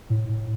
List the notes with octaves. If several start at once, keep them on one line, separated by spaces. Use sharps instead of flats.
A2
A2